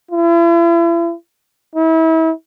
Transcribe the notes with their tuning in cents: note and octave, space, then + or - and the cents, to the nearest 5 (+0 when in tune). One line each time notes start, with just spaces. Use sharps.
E4 +40
E4 -35